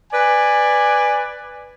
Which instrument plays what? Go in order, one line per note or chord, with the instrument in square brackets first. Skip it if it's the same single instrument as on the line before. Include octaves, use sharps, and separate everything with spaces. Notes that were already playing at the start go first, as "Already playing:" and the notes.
[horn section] B4 D5 G#5